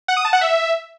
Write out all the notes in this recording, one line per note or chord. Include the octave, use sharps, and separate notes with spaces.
F#5
D#6
A5
F#5
E5